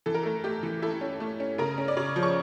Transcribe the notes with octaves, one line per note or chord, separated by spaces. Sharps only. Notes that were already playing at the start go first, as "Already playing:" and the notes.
E3 A4
A#4
A3 A4
A3 G4
E3
E4 A4
C#4
A3
C#4
C#3 A#4
C#4
D5
C#3 C#5
F3
C#6